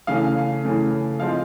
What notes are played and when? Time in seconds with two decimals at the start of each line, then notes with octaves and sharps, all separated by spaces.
0.07 C#3 E3 A3 C#4 F5
0.64 C#3 E3 A3 C#4
1.19 F3 G#3 C4 F5